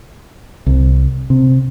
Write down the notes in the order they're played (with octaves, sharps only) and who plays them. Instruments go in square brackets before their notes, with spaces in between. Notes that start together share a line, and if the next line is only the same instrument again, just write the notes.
[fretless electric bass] C2
C3